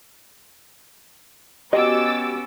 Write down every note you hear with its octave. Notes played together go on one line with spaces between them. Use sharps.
B3 C#4 F#4 G4 D#5 D6 E6 A6